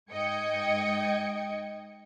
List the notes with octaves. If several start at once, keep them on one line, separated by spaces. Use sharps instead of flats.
G#2 D#5 G5 G#6 C#7